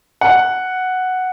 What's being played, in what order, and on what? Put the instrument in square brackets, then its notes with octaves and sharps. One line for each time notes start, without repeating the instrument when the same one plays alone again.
[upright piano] F#5